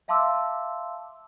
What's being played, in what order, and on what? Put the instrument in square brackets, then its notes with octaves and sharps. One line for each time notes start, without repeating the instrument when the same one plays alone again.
[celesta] E5 F5 A5 C6 D6 E6